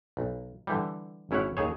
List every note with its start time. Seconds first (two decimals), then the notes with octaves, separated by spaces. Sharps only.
0.17 B1
0.67 D3 E3 G3
1.31 G#1 C#4 E4 C#5 F#5
1.57 D#2 G#4 C#5